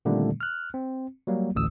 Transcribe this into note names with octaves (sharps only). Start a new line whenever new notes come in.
A#2 D3 D#3 G3 A3 C4
F6 F#6
C4
F#3 G3 A#3
A1 D2 D#6 E6